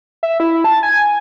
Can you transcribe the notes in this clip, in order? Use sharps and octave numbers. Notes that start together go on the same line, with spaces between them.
E5
E4
A5
G#5